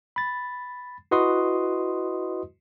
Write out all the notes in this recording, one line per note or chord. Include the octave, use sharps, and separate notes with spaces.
B5 A6
E4 F#4 B4 D#5 C6 D#6